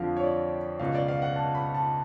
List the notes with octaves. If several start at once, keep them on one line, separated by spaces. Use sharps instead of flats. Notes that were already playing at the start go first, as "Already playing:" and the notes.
Already playing: F2 D3 F3 F5
C#5
D5
C#2 B2 F5
D5
F5
F#5
A5
B5
A5